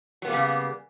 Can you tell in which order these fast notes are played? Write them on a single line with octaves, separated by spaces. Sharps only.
F#3 B3 A#3 G3 C#3